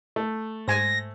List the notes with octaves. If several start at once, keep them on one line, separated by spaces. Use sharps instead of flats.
A3
G#2 C5 G#5 A#6